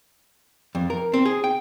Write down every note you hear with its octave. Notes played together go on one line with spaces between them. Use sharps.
F2
A#4
C4
G#4
G5